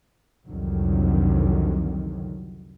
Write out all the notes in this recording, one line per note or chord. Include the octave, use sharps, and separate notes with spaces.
C2 F2 D3 D#3 F#3